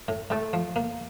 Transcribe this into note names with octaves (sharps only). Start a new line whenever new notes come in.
A2
A2 A3
F3
A#3